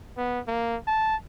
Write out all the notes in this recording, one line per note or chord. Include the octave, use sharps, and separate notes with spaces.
B3
A#3
A5